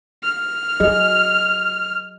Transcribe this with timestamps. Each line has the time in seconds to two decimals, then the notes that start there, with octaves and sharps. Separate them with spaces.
0.23 F6
0.80 F#3 G#4 D#5